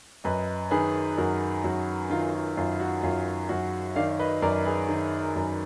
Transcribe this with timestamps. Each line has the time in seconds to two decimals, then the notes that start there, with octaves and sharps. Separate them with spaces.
0.24 F#2 B4 D#5
0.71 D#3 G#4 B4
1.18 F#2 F#4 A#4
1.64 F#2 F#4
2.10 D#3 F4
2.33 F4
2.57 F#2 F4
2.80 F#4
3.03 F#2 F4
3.49 F#2 F#4
3.96 D#3 D5 F5
4.19 B4 D#5
4.42 F#2 A#4 D5
4.65 G#4 B4
4.89 D#3
5.36 F#2